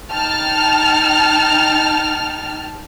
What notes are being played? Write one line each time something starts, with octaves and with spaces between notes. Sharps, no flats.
D#4 G5 A5 F6